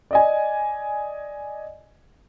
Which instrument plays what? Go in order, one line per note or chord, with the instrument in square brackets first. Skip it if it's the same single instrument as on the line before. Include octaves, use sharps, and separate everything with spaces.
[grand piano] D5 D#5 G#5